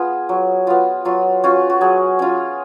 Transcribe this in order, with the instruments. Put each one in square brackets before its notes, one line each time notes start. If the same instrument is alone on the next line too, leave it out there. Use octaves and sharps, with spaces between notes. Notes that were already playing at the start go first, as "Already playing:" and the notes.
Already playing: [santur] B3 F4 G#4
F#3
B3 F4
F#3 F4
C#4 F4 F#4
F#4
F#3 G#4
C#4 F4